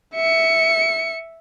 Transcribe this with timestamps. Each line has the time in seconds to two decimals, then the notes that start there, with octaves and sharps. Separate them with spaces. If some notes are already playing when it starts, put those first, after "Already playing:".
0.15 E5 C#7